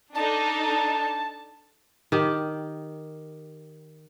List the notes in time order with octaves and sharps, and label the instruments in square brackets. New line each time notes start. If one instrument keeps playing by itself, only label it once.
[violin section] D4 D#4 A4 [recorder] A5
[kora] D#3 G4